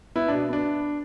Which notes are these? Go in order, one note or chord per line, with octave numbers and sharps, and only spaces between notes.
B3 E4
B2 D4
B3 D4